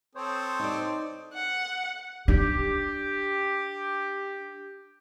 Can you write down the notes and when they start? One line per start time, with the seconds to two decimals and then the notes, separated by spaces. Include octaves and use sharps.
0.15 C4 A4 C5 C#5 D#6
0.60 D#4 D5 D#6
1.34 F#5
2.28 D4 G4